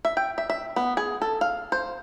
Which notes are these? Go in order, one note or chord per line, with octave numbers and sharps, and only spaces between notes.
E5
G5
E5
E5
B3
G#4
A4
F5
C5